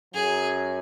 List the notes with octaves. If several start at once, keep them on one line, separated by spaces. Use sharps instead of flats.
F#2 F#3 G#4